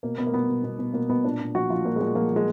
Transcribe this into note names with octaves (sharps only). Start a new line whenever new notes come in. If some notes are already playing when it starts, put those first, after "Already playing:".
B2 A#3
B2 B3
A#3
B2 B3
B2
B2
B2
B2 A#3
B2 B3
A#2 D4
A#2
F3 F#4
F3 F4
A#2 A#3
G#3
A#2 A#3
F3 A#3
F3
G#3